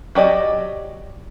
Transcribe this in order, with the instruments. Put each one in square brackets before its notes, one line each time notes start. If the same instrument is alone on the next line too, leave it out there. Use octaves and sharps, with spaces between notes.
[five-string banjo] F#3 G4 D5 D#5